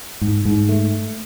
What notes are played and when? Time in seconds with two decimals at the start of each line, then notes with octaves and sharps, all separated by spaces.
0.21 G#2
0.45 G#2
0.69 A3